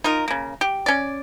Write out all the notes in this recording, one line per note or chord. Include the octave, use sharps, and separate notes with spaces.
D#4 F4 A#4
C#3 A#3
G4
C#4 D5